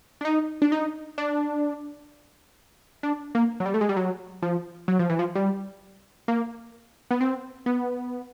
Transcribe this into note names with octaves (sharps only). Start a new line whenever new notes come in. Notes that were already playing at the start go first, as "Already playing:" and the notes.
D4
D#4
D4
D#4
D4
D4
A#3
F#3
G3
A3
G#3
G3
F#3
F3
F#3
F3
E3
F3
G3
A#3
B3
C4
B3